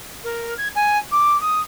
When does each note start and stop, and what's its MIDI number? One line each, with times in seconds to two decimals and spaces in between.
0.24 0.54 70
0.58 0.68 92
0.75 0.98 80
1.11 1.39 86
1.41 1.60 87